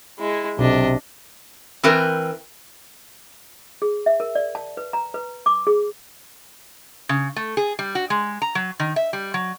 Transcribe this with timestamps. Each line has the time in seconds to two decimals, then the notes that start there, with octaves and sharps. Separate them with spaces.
0.19 G#3 E4
0.59 B1 C3 D4 D#5
1.83 E3 C4 A#4 B4
3.82 G#4
4.06 E5
4.20 A#4
4.35 D5
4.55 A5
4.77 B4
4.93 A#5
5.14 B4
5.46 D6
5.67 G#4
7.09 C#3
7.36 A3
7.57 G#4
7.79 G3
7.95 F#4
8.10 G#3
8.42 A#5
8.55 F#3
8.80 D#3
8.96 E5
9.13 G3
9.34 F#3